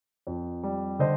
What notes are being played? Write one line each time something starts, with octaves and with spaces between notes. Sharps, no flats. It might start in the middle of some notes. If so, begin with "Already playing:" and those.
F2
G3
D3 C5 D#5